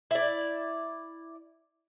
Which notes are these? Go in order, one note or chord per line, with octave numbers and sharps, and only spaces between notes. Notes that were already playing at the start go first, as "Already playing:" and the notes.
E4 D5